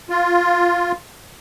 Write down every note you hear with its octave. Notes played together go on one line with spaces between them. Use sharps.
F4